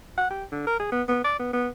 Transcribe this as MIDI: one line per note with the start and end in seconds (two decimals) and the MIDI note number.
0.18 0.29 78
0.30 0.44 67
0.51 0.64 50
0.67 0.80 70
0.80 0.91 68
0.92 1.02 59
1.08 1.22 59
1.24 1.37 74
1.39 1.49 59
1.53 1.68 59